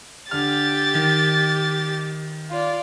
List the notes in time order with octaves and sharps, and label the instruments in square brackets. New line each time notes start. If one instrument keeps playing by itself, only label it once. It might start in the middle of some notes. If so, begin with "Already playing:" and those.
[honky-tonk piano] D3 F6 [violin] G4 A6
[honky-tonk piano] D#3
[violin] F4 D5